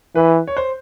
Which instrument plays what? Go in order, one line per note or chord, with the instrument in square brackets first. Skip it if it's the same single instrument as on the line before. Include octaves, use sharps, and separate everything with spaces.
[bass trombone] E3 [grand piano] B4
[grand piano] C#5
C5